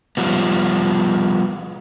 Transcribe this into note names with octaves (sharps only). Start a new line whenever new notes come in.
F3 G3 B3